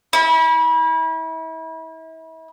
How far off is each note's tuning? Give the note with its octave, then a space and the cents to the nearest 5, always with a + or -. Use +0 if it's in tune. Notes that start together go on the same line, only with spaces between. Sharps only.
E4 -35